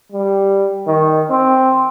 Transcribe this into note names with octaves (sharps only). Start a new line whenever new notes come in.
G3
D#3
C4